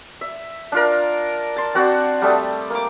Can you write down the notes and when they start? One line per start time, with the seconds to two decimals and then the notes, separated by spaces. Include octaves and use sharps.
0.21 E5
0.72 D4 F4 A#4
1.56 A5 C6
1.75 C4 F#4 D5 F#5
2.22 G3 A3 D#6
2.70 A#3 D6